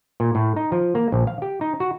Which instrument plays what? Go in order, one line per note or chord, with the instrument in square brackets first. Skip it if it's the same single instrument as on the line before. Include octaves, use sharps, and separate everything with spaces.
[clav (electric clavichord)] A#2
A2
D#4
F3
A#3
A#1
F5
G4
D#4
F#4